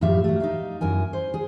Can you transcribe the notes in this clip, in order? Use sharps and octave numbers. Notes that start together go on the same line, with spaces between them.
F#2 A2 F3 G4 E5 F5
F#3 A3
D#4 E5 F5
F#2 E4 A#4 G#5
C5
G#4